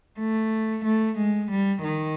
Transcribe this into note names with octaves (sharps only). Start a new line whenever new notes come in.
A3
A3
G#3
G3
D#3